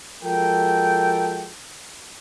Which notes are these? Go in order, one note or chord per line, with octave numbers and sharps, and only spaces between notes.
F3 G#3 F#4 A4 A#4 G5